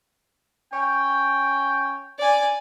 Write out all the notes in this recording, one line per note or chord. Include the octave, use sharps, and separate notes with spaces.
C#4 C#5 G5
D5 G#5